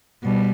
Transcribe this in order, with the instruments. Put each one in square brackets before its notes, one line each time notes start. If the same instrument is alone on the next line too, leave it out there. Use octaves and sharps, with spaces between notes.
[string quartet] B2 G3